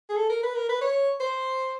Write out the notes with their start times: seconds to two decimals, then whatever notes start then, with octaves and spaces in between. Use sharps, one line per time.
0.10 G#4
0.16 A4
0.30 A#4
0.43 B4
0.55 A#4
0.69 B4
0.81 C#5
1.20 C5